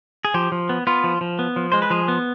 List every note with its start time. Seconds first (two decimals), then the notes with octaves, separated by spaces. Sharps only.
0.25 G#4
0.34 F3 G4
0.52 F3
0.69 B3
0.87 B3 F4
1.04 F3
1.21 F3
1.39 B3
1.56 F3
1.72 G#3 C5
1.82 B4
1.90 F3 G#4
2.08 B3